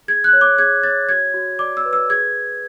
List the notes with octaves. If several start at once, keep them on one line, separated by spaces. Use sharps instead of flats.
G#4 G#6
F#6
C#5
D6
G#4 G#6
C#5 A6
F#4 G#6
F#4
D5 D6
E6
B4
E6
G#4 G#6